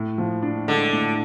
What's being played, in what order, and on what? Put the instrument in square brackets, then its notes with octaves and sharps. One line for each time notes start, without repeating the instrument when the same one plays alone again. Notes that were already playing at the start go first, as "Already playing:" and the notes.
Already playing: [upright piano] A2
F3
D4
[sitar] D3 [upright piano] G#3
[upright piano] A2